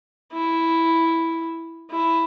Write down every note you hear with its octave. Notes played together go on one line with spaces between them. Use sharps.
E4
E4